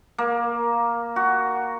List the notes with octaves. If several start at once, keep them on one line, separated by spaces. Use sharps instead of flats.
A#3
F#4